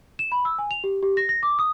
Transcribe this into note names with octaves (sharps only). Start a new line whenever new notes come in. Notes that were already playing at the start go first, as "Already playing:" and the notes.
E7
B5
E6
G#5
F7
G4
G4
A#6
A#6
D6
D#6